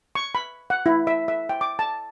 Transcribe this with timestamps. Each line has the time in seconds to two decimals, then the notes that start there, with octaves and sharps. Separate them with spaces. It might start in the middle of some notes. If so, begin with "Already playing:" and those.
0.15 C#6
0.35 B5
0.70 F#5
0.86 E4
1.07 E5
1.28 E5
1.49 G5
1.61 D6
1.79 A5